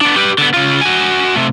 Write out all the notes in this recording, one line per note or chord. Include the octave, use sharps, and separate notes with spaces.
B3 D4
G4 B4
D3 B3
C#3 F4
F#4 G#5
C3 A3